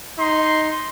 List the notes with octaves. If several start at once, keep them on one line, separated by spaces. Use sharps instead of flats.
D#4 C6